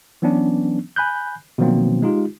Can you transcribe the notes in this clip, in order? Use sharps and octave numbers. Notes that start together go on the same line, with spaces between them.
E3 F#3 B3 C#4 D4
G#5 B5 F#6 G6
B2 D#3 F3 F#3 A#3 C4
G#3 D#4 F4 G4